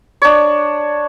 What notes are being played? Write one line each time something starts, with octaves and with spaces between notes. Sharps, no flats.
D4 C#5